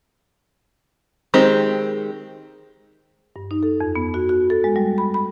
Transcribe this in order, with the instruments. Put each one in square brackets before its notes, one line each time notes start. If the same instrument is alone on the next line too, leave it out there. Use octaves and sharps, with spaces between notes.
[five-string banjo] D#3 G#3 C4 G4
[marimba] G2
D#4
A4
F2
B3
F#4
F#4
A4
G#3
G3
B5
B5